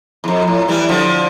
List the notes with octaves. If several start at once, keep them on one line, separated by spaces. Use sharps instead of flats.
E2
F2
A2
E3 G3
D3 F3